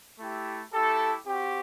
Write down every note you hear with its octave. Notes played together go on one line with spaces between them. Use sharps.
A3 E4 G4
A3 E4 G4 A4
C4 F#4 G4